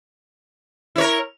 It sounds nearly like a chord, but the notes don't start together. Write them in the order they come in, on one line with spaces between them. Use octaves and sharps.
E4 C#5 A#4